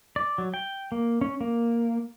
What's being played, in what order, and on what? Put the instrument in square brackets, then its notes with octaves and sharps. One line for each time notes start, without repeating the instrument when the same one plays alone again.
[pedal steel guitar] D5
F#3
G5
A#3
C#4
A#3